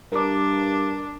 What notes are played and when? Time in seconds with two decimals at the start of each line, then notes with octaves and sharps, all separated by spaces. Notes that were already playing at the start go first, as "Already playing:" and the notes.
0.12 G2 D4 A#4 D6